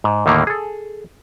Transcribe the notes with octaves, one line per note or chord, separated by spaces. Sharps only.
G#2
D#2 A2 D3 D#3 A#3
G#4 A4